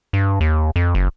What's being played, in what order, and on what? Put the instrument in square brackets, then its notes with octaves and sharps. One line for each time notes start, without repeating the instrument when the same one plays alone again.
[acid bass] G2
D#2
F2
F#1